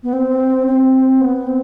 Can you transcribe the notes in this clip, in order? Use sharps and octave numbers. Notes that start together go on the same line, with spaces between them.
B3
C4
C4
B3
C4